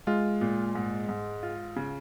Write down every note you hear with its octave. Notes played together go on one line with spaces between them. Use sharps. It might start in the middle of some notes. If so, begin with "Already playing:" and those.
G#3 F4
A#2
G#2
G#2
F4
C#3